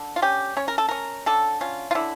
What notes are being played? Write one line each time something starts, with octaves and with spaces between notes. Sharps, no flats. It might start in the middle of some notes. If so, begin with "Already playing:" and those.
Already playing: D3
F4
C#4 G4
C#4 C#5
A#4
A4
C#4 A#4
D3 A4
C#4 F4
F4
D3 E4